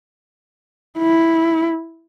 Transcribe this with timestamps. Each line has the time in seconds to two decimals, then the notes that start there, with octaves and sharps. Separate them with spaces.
0.98 E4